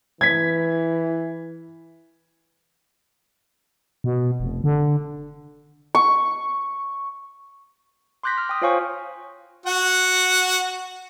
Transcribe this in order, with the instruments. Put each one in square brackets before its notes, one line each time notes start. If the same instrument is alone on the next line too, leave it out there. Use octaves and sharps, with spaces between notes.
[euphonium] E3 [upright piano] G#6 B6
[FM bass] B2
F1
D3
[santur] C#6
[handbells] C6 D6 F#6 G6 A#6 B6
F6
G5 D#6
F4 C5 C#5 F5 G#5 C#6
[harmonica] F#4 F#5